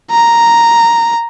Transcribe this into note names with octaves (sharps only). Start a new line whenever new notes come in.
A#5